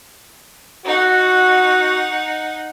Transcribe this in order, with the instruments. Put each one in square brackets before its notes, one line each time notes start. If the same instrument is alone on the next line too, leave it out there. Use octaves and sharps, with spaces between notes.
[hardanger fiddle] D#4 F#5 [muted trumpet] F#4